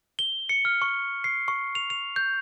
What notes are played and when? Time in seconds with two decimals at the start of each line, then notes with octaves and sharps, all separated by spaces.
0.19 G7
0.49 C#7
0.65 F6
0.82 C#6
1.24 C7
1.48 C#6
1.75 F7
1.90 F7
2.16 G6